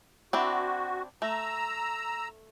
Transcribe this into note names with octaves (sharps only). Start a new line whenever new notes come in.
C4 D4 E4 F#4
A3 A#5 E6